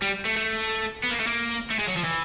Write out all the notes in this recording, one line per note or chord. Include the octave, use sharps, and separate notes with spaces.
G3
A3
A3
B3
A#3
A3
A#3
A3
G#3
F#3
F3
E3